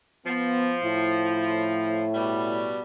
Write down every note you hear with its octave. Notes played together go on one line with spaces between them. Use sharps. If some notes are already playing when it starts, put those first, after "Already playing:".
F3 B3
A2 E4
B2 G3